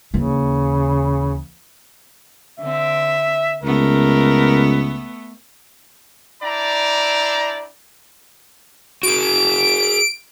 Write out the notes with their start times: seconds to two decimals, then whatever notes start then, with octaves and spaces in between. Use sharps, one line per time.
0.14 D#2 C#3 E3
2.59 D3 C4 E5
3.63 C#2 A3 B3 A#4
6.42 D4 E4 D5 G5 A#5
9.03 F#4 G#4 D7